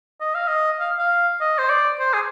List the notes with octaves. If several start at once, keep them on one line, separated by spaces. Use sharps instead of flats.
D#5
F5
D#5
F5
F5
D#5
C5
D5
C5
G#4